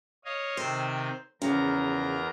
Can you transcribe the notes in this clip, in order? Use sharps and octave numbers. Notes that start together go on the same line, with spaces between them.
C#5 D#5 F5
C3 D#3 C4 C5
E2 C#3 F3 A#4 A#5